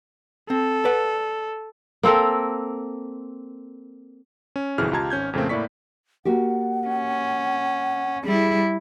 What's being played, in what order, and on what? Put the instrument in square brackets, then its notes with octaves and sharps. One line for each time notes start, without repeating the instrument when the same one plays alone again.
[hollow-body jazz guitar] C4 [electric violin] A4
[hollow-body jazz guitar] B4 D5 F#5
[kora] A#3 C4 A4 A#4
[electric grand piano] C#4
G1 F2 B2 E3 G#4 F6
C#2 F4 G4 A5 A#5 G#6
G#1 C#4 G6 G#6
F2 A#2 C#3 A3 A#3 C4
A2 A#3 E4 D5 C#6 B6
[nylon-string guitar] A#3 F#4 G4 [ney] F#5
[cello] C#4
[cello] G3 E4 [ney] G#4